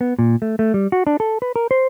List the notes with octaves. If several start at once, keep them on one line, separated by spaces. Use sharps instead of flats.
B3
A#2
A3
A3
G3
F#4
D4
A4
B4
A#4
C5